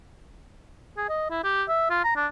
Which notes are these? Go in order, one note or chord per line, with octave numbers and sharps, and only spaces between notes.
G#4
D#5
E4
G4
E5
F4
A#5
D4